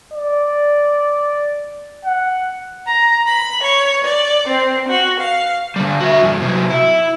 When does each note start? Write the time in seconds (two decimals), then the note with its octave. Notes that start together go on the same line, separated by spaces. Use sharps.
0.13 D5
2.05 F#5
2.86 A#5
3.26 B5
3.63 C#5
4.04 D5
4.48 C4
4.88 F#4
5.19 F5
5.76 D3 G3
6.00 F#4 E5
6.23 G2 E3
6.41 C3 F#3
6.70 E4